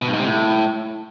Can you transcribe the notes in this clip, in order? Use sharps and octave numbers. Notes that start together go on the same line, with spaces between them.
B2
G2
G#2
C3
A2